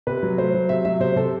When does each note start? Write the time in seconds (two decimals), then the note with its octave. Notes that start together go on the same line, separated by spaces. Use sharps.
0.07 C3 B4
0.23 F#3
0.38 A3 C5
0.54 F#3
0.69 C3 E5
0.85 F#3 E5
1.00 C3 C5
1.16 C3 A4